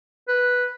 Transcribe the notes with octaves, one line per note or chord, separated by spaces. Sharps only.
B4